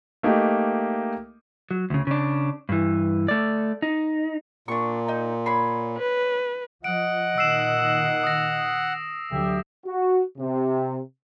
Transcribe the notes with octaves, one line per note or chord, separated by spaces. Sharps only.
A3 A#3 D#4 G4
F#3
D2 C#3
C#3 D4
G2 E3
A3 D5
D#4
A#2 D4 C#6
D#4
C#5 B5 C6
B4
F3 D#5 F#5 D7
A#2 D#3 E6 C7 E7
D#6 A#6
D2 D3 F#3 G4 E5
F#4
C3